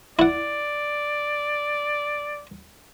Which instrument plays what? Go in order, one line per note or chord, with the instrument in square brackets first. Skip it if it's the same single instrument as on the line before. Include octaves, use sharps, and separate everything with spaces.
[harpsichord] E4 F#5 [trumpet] D5